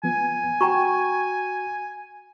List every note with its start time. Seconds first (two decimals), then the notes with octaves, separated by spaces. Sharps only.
0.04 F3 B3 G#5
0.61 F#4 G5 A#5 C#6